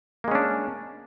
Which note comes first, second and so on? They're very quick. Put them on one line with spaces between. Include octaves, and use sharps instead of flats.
A#3 G#3 C#4 D4